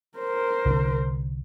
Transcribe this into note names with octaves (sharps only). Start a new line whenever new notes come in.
A#4 C5
C2 D3